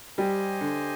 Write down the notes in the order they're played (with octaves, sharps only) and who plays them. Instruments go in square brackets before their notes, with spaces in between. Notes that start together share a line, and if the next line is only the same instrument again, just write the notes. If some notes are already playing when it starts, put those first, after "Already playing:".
[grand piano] G3 [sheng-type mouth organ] G4 C5 D#5 G#5
[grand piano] D3